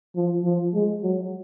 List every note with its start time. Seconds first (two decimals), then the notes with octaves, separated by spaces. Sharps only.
0.16 F3
0.44 F3
0.74 G#3
1.03 F#3